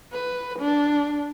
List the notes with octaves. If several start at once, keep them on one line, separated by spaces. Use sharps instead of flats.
B4
D4